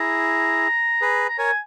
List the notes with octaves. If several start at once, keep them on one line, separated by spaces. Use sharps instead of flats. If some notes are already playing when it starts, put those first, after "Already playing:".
Already playing: E4 G#4 A#5
G#4 B4
A#5
A#4 C#5 G#5